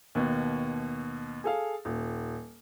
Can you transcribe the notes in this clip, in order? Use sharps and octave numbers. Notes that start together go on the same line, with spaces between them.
D#2 B2
G#4 A4 F5
D#1